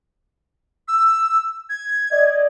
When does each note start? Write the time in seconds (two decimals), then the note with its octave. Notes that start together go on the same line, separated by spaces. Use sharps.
0.88 E6
1.70 G#6
2.12 D5 D#5